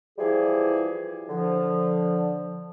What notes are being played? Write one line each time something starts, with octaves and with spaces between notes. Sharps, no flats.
E3 F3 G3 E4 G4 G#4
D3 F3